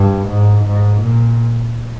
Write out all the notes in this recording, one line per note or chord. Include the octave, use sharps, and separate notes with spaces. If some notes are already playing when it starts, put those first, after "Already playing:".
Already playing: G2
G#2
G#2
A#2